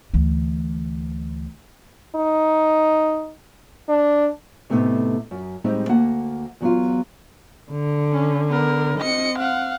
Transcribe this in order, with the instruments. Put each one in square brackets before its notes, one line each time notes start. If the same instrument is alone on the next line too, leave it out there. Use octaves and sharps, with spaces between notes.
[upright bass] D2 E3
[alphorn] D#4
D4
[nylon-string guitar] A2 C3 A3 B3 D#4
F#2
A2 G3 G#3 C4 D#4
D2 A#3 F#5 A5
E2 F#3 B3 F4
[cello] D3
[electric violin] C#4
B3 A#4
[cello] C4 [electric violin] D#5 C#7
[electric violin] F5 F#5